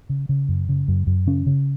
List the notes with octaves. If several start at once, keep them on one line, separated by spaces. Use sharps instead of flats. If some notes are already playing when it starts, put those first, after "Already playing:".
C#3
C#3
F#2
C#3
F#2
F#2
C#3 C#4
C#3